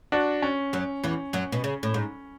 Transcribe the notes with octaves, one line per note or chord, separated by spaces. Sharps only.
D4 F#4
C#4
F#2 F#3
E2 E3
F#2 F#3
B2
C#3
A2
G#2